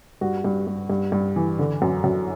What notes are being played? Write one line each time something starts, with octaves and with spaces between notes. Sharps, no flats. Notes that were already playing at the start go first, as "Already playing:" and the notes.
G2 F#4
G2
G2
G2
G2
E3
D3
F#2
F#2